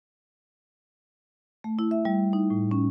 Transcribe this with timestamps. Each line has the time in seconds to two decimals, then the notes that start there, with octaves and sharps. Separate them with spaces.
1.64 A3
1.79 E4
1.91 E5
2.05 G3
2.33 D#4
2.50 A2
2.71 C#4